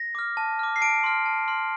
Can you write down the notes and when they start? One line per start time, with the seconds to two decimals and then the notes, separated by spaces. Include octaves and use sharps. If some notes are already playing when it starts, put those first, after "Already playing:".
Already playing: A#6
0.15 D6 F6
0.37 A5
0.59 D6 F6
0.76 C7
0.81 A5 D7
1.04 C6 F6
1.26 A5
1.48 C6 F6